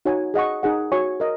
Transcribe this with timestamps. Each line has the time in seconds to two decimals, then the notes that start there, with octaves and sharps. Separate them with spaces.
0.05 D#4 F#4 C#5 G#5
0.34 G#4 D#5 F#5 C#6
0.63 D#4 G#4 F#5
0.92 F#4 C#5 G#5 C#6
1.20 A#4 D#5